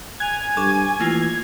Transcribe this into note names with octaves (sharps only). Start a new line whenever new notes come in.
G#5 F#6 G#6 F7
G2 A4 C#6 D6
E3 A3 A#3 F4